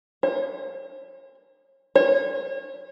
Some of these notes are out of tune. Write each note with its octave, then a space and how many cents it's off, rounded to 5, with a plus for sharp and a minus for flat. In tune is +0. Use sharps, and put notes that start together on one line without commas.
C#5 -45
C#5 -35